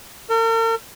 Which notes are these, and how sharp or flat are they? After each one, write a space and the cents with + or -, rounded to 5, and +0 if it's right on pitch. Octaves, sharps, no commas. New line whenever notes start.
A#4 -45